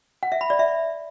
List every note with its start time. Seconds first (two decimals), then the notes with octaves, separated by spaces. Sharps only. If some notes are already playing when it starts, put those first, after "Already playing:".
0.23 F#5
0.32 E5
0.41 B5
0.50 D5
0.59 E5